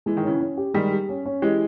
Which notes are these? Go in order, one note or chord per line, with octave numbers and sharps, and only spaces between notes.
E3 G#3
D#3
C#3 E3 C#4
C#4
G4
D#3 G3 G#3
G4
C#4
C#4
E3 G#3 G4